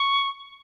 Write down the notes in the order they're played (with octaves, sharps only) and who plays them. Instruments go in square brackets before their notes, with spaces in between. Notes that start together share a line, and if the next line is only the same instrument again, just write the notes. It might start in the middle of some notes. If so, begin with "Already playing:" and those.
Already playing: [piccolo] C#6